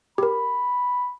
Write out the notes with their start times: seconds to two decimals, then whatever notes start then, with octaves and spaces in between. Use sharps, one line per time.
0.18 G4 A#4 B5